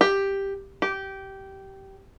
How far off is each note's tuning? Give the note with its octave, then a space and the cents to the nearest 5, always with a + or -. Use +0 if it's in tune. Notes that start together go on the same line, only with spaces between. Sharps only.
G4 +5
G4 -15